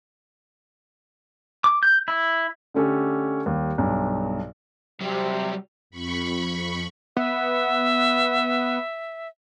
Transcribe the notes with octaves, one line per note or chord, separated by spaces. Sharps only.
D6
G6
E4
D3 A3 C#4 G4 A4
D#2 G3
B1 G2
C3 F#3 G3
F2 B5 C#6
B3 E5